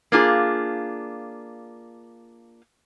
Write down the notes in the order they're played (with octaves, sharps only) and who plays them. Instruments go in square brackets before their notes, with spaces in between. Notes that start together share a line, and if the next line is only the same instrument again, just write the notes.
[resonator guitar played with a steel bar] A#3 D4 F4 G#4